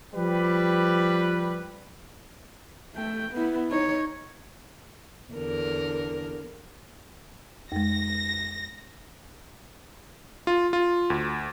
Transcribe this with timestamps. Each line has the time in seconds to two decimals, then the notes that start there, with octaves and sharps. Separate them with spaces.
0.15 F3 G3 G4 B4
2.95 A3 G5
3.32 B3 E4
3.70 D#4 C#5
5.34 E2 D3 A#4
7.72 F2 G#3 A#6
10.47 F4
10.73 F4
11.10 D2